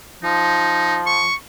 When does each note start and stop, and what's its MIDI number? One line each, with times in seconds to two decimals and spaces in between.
0.24 1.27 53
0.24 0.99 63
1.06 1.35 85